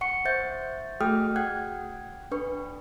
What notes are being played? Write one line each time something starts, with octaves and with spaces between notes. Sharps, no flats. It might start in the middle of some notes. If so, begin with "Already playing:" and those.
F#5 C#6 C#7
C5 E5 C#6 G6 A6
A3 F#4 G#4 G5 D#6 F6
F#5 G5 F#6 G#6
D4 B4 C#6